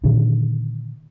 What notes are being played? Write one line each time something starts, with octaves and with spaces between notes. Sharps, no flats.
A#2 D3 D#3